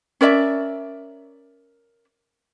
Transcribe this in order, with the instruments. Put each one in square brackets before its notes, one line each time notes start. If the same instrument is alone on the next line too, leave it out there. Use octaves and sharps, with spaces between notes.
[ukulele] C#4 A#4 D5 E5